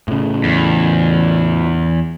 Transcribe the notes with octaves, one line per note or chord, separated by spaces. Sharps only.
A2 C#3
E2